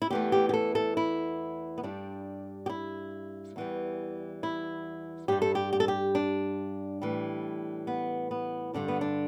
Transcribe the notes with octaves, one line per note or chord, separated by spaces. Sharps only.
E4
E2 E3 A3 G4
G4
G4
A4
A4
E4
B3
G2 G3 D4
G4
E4
E2 E3 G3
E4
G2 G3 G4
A4
G4
G4
A4
G4
D4
A2 E3 G3
B3
B3
G2 D3 G3 D4
B3
D4